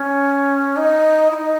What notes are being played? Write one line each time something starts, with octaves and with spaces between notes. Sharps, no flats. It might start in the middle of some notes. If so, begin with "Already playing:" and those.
Already playing: C#4
D#4
E4
D#4